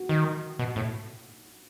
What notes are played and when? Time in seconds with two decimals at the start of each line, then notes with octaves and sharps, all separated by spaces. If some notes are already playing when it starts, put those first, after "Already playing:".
Already playing: F#4
0.09 D#3
0.59 B2
0.76 A2